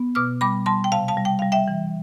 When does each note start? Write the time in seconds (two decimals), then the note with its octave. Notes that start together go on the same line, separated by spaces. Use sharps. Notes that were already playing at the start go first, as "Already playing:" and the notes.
Already playing: B3
0.15 B2 D6 F6
0.41 G3 B5 D6
0.66 G3 A5 C6
0.84 G5
0.92 C3 F5 A5
1.08 F5 A5
1.17 G3
1.25 G5
1.39 G3 F5
1.52 E5 G5
1.68 E3